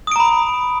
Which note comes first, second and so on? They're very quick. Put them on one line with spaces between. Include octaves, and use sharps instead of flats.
D#6 D7 A#5 B5